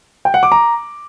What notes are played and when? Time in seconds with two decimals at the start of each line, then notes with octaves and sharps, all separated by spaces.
0.25 G5
0.34 F#5
0.43 D6
0.52 A#5